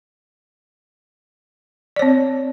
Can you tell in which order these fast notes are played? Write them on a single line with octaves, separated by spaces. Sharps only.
D5 C#5 C4